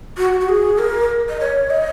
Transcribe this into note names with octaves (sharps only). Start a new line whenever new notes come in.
F#4
F#4
G#4
A#4
D#5
C#5
D#5